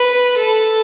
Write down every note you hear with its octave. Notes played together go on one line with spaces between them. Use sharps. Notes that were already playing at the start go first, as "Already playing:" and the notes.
Already playing: B4
A4